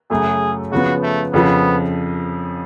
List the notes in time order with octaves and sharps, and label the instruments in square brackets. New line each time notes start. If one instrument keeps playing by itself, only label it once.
[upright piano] F#2 C#3 F#3 A3 [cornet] G#4
[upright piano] C#3 F3 B3 [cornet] F#4
[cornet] A3
[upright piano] F2 C#3 F3 [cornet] B3